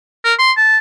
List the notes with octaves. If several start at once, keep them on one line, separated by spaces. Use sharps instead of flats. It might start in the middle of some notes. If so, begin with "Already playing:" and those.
A#4
C6
A5